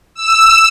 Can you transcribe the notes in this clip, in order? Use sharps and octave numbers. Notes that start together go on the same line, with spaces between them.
E6